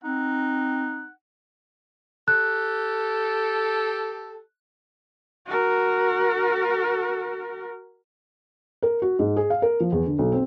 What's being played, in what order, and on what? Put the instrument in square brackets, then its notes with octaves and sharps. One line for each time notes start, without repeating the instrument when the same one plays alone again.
[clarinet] C4 [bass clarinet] D#4 [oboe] F#5
[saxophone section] G4 A4 [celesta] F#6
[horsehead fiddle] F#4 A#4
[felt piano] A#4
F#4
G#2
G#4
F5
A#4
F3
E2
D3
B1
C4